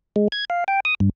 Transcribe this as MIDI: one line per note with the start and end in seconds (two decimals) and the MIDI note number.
0.16 0.28 56
0.32 0.45 92
0.50 0.64 77
0.68 0.80 79
0.85 0.95 87
1.00 1.09 43